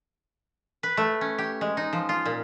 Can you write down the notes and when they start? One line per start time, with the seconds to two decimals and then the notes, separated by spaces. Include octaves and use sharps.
0.83 B4
0.97 A3
1.21 C#4
1.38 G4
1.61 G#3
1.77 D#4
1.93 F3
2.09 F4
2.25 A#2